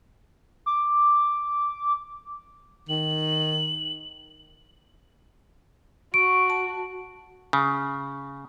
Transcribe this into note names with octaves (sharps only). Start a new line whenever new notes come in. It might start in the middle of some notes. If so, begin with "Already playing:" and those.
D6
D#3 F#7
F#4 C#6 D7
A5
C#3